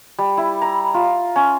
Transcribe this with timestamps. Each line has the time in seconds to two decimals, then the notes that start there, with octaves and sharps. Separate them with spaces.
0.19 G3
0.37 E4
0.62 A#5
0.94 F4
1.36 C#4